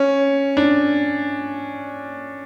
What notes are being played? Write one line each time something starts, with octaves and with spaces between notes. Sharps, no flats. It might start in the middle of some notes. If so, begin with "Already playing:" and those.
Already playing: C#4
D4